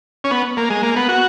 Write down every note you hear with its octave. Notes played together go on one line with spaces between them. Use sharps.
C#4
B3
A#3
G#3
A#3
B3
F#4